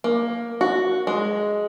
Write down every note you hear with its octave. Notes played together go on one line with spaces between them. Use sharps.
A#3
F#4
G#3